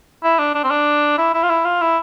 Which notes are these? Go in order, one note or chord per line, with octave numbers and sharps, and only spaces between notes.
E4
D4
D4
C4
D4
E4
E4
F4
E4
F4
E4